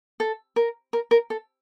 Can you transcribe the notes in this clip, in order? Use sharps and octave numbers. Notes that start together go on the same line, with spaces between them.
A4
A#4
A#4
A#4
A4